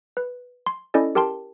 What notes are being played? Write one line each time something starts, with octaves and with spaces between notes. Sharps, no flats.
B4
C6
C#4 E4 A4 D5 D#5
G4 A#4 G5 A5 C6